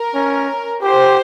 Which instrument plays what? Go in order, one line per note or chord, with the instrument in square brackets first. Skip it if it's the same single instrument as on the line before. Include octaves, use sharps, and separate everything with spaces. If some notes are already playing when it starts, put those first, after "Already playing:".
Already playing: [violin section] A#4
[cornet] C#4
[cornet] G4 [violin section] C5